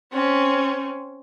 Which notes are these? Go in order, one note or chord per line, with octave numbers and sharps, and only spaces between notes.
C4 C#4